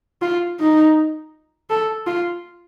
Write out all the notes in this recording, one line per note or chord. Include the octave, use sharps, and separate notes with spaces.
F4
D#4
A4
F4